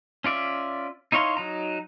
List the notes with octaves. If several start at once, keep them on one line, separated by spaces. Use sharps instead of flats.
C#4 F4 D5 E5
D#4 E4 C#5 F5 C6
F#3 D#4 A#5